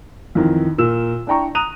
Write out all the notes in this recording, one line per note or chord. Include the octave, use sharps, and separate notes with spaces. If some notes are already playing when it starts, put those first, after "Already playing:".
F2 D#3 E3
A#2 A#4 E6 E7
D4 E4 G5 A#5 C#6
A#5 D#6 F#6 D#7 F7